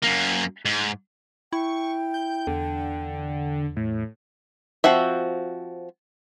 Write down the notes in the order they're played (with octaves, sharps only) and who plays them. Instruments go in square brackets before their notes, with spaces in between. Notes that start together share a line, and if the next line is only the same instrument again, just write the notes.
[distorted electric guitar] F#2 A#3
G#2
[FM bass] E4 [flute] G5 [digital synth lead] C#6
[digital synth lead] G6
[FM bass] E2 [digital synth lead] D3
[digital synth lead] A2
[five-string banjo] F3 C4 F#4 E5